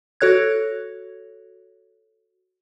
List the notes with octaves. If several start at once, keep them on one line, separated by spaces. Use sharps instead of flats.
F#4 A4 C#5 F#6 G#6